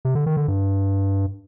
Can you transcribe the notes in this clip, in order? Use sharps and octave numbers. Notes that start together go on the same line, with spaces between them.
C3
D3
D#3
D3
G2